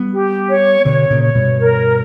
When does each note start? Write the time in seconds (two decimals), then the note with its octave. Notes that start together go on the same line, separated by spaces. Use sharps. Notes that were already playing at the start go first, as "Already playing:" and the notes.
Already playing: G3 B3
0.12 G4
0.49 C#5
0.85 B2 D3 C#5
1.10 A#2 C#3
1.23 C#5
1.35 G2 B2
1.60 A#4